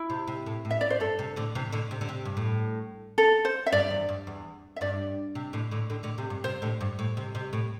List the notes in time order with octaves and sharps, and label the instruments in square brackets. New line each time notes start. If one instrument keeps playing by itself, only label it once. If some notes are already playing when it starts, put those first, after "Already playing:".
Already playing: [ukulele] E4
[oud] C3
C3
A2
A2
[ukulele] E5
D5
C5
[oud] G2 [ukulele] A4
[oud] C3
A2 D3
C3 E3
A2 D3
C3
D3
C3
G2
A2
[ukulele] A4
C5
E5
[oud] G2 [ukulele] D5
[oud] E2
G2
E2
[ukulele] E5
[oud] G2 [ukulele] D5
[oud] C3
A2 D3
A2 D3
A2 D3
A2 D3
C3
G2
[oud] C3 [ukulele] C5
[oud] A2 D3
G2
A2
C3
C3
A2